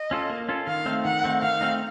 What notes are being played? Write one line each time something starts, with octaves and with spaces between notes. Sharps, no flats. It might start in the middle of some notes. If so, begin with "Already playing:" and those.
Already playing: D#5
C#4 F4 A4
A#3
C#4 F4 A4
D#3 F5
A3 C4 D#4
D#3 F#5
A3 C4 D#4
D#3 F5
A3 C4 D#4